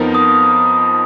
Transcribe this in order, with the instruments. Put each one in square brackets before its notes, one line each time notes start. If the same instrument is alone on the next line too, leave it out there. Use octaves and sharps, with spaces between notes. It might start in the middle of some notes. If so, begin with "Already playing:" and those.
Already playing: [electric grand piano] F2 F3 B3 D#4 A#4
[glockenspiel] D#6